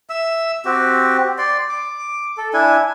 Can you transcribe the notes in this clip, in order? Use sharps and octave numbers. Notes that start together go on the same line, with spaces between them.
E5 E6
C4 F#4 G4
D5 C6
D6
A4
D4 E4 G#5